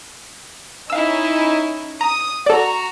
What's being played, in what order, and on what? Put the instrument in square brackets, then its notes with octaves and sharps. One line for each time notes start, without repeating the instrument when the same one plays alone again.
[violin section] C#4 D#4 E4 [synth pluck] F5 E6
[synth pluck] A#5 [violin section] D#6
[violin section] F#4 A#5 [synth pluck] A4 D5